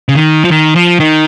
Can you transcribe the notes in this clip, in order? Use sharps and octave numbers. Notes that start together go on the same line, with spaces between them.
C#3
D#3
F3
D#3
F3
D#3